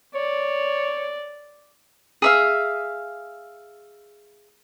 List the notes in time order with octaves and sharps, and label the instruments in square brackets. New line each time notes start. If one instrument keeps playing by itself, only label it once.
[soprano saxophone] C#5 [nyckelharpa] D5
[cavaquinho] G#4 E5 F5